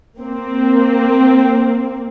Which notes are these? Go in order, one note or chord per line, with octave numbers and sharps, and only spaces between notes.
A#3 C4